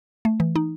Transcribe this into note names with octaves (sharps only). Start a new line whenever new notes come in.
A3
E3
D#4